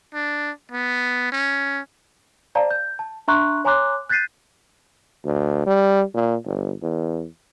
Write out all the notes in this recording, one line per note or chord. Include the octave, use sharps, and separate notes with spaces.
D4
B3
C#4
C5 D5 F5 A5 A#5
G6
A5
D4 E5 A#5 C6 C#6 F#6
C#5 G#5 A#5 C6 D6 F#6
F#6 G6 A6 B6 C7 D#7
D2
G3
A#2
G1
E2